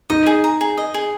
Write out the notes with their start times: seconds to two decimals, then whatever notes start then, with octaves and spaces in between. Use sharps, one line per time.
0.10 D#4 D#5
0.26 G#4
0.44 A#5
0.61 G#4
0.77 D#5
0.94 G#4